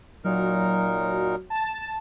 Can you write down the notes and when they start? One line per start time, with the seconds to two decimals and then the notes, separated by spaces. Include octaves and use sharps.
0.25 A#2 F#3 D#4 A#4
1.50 A5